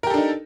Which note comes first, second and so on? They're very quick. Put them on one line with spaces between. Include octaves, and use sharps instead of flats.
A#4 G4 A4 D4 D#4